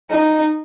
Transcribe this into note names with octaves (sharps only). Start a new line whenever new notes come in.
D#4